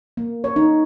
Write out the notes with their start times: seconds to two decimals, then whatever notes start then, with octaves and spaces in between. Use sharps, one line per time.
0.17 A#3
0.44 C#5
0.56 D#4